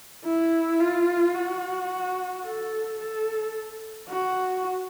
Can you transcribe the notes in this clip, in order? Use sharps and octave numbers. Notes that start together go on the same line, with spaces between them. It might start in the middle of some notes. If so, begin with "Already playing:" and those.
E4
F4
F#4
A4
A4
F#4